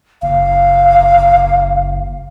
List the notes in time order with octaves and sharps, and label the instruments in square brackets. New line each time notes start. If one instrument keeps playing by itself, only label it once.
[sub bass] F#1 [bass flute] F5